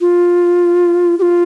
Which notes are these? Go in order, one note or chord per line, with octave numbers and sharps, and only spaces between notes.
F4
G4
F4